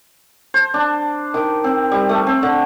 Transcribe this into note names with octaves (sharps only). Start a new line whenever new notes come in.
C5
D4
D#3
C4
G3
A3
C4
D3